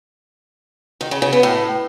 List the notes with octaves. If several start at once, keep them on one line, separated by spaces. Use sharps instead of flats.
D#3
C#3
C#3
B3
A2